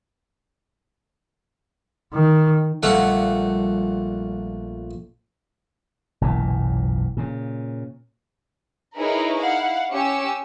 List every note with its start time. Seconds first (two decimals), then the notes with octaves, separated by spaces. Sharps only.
2.13 D#3
2.83 A#1 G3 A3 F5 F#5
6.21 F#1 B1 A#2 E3
7.17 A#2 C#3
8.97 D#4 E4 G#4 A#4 B4 C#5
9.39 E4 F5 F#5
9.90 C#4 G4 G#5 E6 C#7